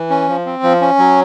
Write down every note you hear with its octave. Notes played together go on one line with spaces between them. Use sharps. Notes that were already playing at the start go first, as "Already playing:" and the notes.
Already playing: E3
C#4
F3
C4
F3
C#4
F#3